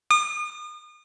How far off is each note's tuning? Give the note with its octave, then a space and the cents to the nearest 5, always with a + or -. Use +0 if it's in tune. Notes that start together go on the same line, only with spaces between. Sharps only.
D#6 -40